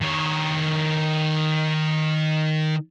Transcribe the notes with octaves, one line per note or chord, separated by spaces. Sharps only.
D#3 C#5